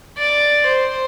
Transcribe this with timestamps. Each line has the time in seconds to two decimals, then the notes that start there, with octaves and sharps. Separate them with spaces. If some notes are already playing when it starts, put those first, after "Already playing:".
0.18 D5
0.67 C5